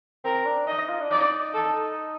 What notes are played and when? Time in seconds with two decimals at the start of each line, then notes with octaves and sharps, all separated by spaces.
0.24 C4 A#4
0.46 D4
0.67 D#4 D#5
0.89 F4
1.00 D4
1.11 D#4 D5
1.54 A4